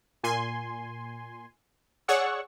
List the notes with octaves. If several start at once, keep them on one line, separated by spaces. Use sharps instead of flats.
A#2 G#5 C6
G#4 C#5 D5 F#5 C#6 E6